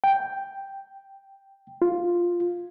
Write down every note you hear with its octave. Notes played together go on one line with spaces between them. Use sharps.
G5
F4